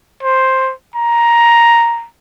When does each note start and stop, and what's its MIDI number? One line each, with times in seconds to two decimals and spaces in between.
0.23 0.72 72
0.95 2.06 82